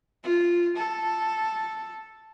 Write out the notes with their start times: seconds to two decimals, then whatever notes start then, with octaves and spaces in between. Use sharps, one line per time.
0.24 F4
0.76 A4